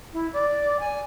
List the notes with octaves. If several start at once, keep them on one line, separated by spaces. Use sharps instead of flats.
E4
D5
G#5